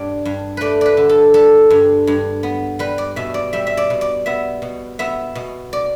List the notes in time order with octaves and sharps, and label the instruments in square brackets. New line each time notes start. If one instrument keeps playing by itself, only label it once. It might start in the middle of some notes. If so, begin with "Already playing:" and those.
Already playing: [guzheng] G2 D5
G2
A3 B4 D5
B4 D5
D3
A4
G3 A4
G2
G2
B3
G3 B4
D5
B2 E5
D5
G3 E5
E5
D5
B2
D5
B3 E5
B2
B3 E5
B2
D5